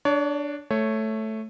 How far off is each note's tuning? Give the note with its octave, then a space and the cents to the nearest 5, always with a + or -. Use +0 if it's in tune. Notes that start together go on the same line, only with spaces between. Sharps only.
D4 +0 C#5 +35
A3 +0 C#5 -5